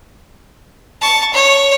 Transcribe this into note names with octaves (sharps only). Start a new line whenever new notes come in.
A5 C#6
C#5